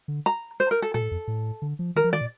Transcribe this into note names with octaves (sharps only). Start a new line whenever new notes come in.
D3
A#5
C5
A#4
A4
A#2 A4
A2
F2
A2
D3
F3
D#3 A#4
F3
D#3 D5
A#2